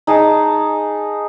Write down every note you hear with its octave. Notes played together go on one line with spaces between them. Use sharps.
D#4 G#4 A5